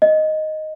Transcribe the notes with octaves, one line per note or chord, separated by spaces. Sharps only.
D#5